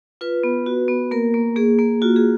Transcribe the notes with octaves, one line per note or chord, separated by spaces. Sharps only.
F4 B4
B3
F#4
B3
A#3 A#4
A#3
A#3 G#4
A#3
F4 F#4
G#4